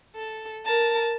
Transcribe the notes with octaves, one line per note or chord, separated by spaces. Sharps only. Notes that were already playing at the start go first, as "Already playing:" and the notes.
A4
A#4 A5